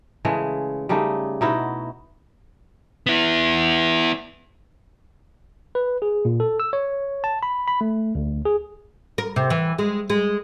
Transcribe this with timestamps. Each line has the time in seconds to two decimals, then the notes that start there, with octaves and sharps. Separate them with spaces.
0.25 C#3 E3 G#3 A3
0.89 C#3 G3 A3 D#4
1.41 B2 D#4 E4 F#4
3.06 B3 E4
5.75 B4
6.02 G#4
6.25 A#2
6.40 A4
6.60 E6
6.73 C#5
7.24 A5
7.43 B5
7.67 B5
7.81 A3
8.15 D2
8.46 G#4
9.18 A#4
9.36 C3
9.50 E3
9.79 G#3
10.10 G#3